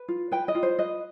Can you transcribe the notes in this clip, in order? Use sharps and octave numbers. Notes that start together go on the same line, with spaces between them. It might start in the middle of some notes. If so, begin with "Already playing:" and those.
Already playing: B4
F4
B4 G5
D#5
F4
C5
B4 D#5